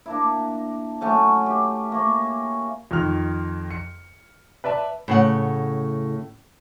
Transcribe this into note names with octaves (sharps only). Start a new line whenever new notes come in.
A#3 D4 E4
F#3 A3 C#4 F#5
G4
A#3 C#5
F2 D#3 F6
C#7
B4 D5 E5 A5
A2 C#3 F#5